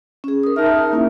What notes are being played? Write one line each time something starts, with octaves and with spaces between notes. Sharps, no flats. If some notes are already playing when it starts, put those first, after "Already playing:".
C#4 G#4
A#4 D#6
D#4 A#4 E5 A5
A#3 C#4 E4